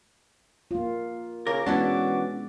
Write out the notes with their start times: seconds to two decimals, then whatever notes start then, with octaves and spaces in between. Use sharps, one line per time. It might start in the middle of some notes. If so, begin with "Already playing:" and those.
0.71 A#3 F4
1.47 C#3 A#4 D6
1.66 E3 G#3 B3 C#4 D4 F#4